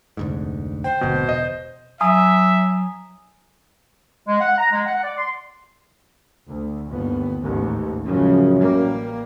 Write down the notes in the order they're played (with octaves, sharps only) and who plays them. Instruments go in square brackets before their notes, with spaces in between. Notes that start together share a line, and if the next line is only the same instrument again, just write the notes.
[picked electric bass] F1 D2 G#2
[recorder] C5 [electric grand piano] G5
[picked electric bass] D1 G#1 D2 [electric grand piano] B2
[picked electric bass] E1 [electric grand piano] D#5
[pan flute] F#3 [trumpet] E5 [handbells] G#5 A#5 D#6
[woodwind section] G#3
F#5
A#5
G#3
F#5
D5
C6
[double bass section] D2
G1 D#2 B3
A1 D#2 G#2
[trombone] F#2 [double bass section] C#3 F3 G#3
[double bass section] A1 G3 A#3